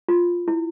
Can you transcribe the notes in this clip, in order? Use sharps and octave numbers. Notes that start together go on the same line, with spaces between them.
F4
E4